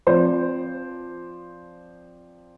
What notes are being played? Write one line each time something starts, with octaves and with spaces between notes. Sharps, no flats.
F3 C4 C5 D5